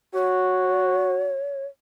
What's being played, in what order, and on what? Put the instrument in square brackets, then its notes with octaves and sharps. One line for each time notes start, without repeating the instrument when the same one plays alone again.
[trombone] F#4 [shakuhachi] C#5